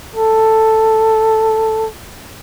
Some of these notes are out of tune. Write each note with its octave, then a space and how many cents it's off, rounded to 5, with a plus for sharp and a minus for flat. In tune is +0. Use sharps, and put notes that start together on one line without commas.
A4 +5